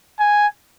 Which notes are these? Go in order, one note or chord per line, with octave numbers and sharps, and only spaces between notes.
G#5